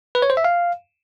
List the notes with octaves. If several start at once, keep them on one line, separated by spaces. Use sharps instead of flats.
B4
C#5
C5
E5
F5